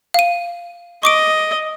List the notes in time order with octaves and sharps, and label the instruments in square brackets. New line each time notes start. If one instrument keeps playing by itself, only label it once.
[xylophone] F5 D#7
[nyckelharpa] D#5 [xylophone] C#6 D6 D7